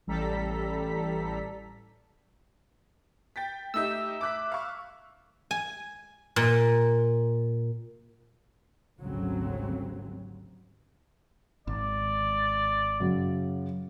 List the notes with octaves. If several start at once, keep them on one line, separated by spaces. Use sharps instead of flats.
A1 G3 A4 A#5 B6
G5 A6 B6
A3 D#4 G4 E5 E6
D6 F#6 B6
F5 C#6
G#5
A#2
G#1 D2 C#3 F#3 G3 C4
G#1 D5
F#2 C#3 F#3